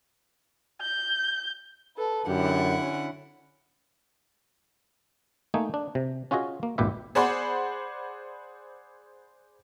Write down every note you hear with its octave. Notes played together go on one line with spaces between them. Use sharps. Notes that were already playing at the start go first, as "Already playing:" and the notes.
G6
A4 B4
F#2 D3 E4 G4 F#5
C#4
A3 A#3 D#4 G#5
D4
C3
C#4 F4 F#4 G#4 D#5
A#3
G#1 D#2 A#2 G4 B4 E5
G#4 C5 D5 F#5 B5 C6